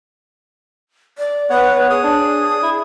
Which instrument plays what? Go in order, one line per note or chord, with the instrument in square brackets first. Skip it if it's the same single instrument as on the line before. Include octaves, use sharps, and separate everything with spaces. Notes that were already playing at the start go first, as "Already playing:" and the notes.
[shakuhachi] D5
[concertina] B3 F#5 [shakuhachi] B4 [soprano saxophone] C#5
[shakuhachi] G#4 [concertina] D#6
[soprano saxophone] D4
E4